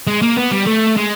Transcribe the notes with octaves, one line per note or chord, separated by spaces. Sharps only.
G#3
A#3
B3
G3
A3
G#3